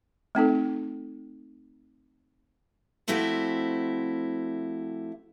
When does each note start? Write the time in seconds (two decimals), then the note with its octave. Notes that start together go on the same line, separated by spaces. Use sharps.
0.35 A3 C4 D#4 A4
3.08 F3 A3 C4 E4 F#4 G4